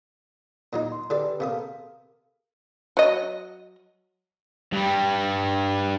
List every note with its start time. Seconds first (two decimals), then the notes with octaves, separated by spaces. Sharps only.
0.73 A#2 F#3 D#4
0.92 C6
1.10 D3 D4 G4 G#4 B4 D5
1.40 C3 B3 A4 A#4 F5 D#6
2.97 F#3 D#5
4.73 G2 G3